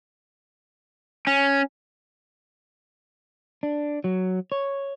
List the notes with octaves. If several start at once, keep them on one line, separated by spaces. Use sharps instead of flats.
C#4
D4
F#3
C#5